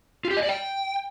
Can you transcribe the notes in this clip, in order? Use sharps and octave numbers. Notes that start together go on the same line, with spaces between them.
F4
G4
D#5
D5
G5